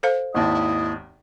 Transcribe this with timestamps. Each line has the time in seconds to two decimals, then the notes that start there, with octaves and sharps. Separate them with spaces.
0.03 A4 C5 F5
0.34 G#1 D#2 E4 D#5 A5